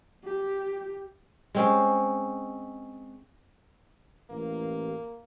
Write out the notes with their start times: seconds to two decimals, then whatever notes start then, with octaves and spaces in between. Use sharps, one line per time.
0.24 G4
1.55 G#3 C4 C#4
4.30 A1 A#3